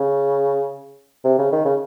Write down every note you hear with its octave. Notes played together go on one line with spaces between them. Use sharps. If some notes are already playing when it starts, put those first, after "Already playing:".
Already playing: C#3
C3
C#3
D#3
C#3